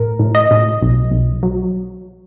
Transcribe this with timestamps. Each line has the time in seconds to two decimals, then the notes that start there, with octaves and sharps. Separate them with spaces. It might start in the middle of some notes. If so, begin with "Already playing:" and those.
Already playing: A2 A#4
0.19 A2
0.35 D#5
0.51 A2
0.82 B1
1.11 B1
1.43 F#3